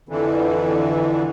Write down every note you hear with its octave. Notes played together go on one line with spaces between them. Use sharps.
F2 D3 E3